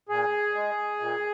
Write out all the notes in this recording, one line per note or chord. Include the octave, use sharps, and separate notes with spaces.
A#2 G#4
G#3
A#2